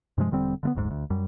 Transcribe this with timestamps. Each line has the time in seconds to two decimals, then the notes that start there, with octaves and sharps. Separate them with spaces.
0.18 G2 C3 F3 G#3
0.31 E1 D3 G3 C4
0.63 D3 A3 B3
0.75 F#1 D2 G#2 G#3
0.91 D2
1.10 F#2 G3